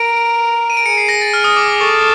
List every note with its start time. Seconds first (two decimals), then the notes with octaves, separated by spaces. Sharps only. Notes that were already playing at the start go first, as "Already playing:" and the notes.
Already playing: A#4 D7
0.70 D#7
0.77 D7
0.85 G#4 C#7
0.98 C7
1.09 A#6
1.21 A6
1.33 F6
1.44 D#6
1.57 D6
1.69 D6
1.80 A4 C#6